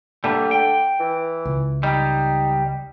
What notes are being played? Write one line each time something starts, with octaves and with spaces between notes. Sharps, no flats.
D3 G3 A3 A#3
G5
E3
C#2
G3 D#4